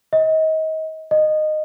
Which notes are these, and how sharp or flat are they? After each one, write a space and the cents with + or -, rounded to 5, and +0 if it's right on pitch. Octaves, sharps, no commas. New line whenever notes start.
D#5 +30
D#5 -15